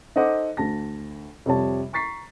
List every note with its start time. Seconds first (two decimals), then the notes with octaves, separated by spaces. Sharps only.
0.16 D#4 A4 C5 D#5 F#5 D6
0.57 D2 A5 A#6
1.46 F2 C3 G3 C#5 A5
1.93 A#5 C#6 A6 B6 C7